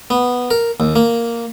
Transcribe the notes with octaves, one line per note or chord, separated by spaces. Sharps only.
B3
A#4
D#2
A#3